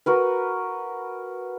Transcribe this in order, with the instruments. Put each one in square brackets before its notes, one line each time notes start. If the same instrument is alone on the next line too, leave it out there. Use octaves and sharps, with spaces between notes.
[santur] F#4 A#4 B4